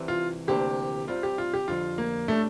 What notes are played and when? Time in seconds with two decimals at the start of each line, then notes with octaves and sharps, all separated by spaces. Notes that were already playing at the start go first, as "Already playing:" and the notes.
Already playing: C2 C3 E3
0.08 F4
0.47 D2 C3 E3 A#3 D4 G4
1.07 C2 C3 G3 F4
1.23 G4
1.38 F4
1.53 G4
1.68 F2 D3 G3 F4
1.98 A#3
2.28 A2 G3 A3 D4